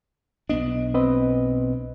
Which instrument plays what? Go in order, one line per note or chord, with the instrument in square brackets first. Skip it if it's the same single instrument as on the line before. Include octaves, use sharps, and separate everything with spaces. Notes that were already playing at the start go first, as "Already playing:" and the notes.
[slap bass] B1 B3 D4 [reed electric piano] D#5
[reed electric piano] C4 B4 D#5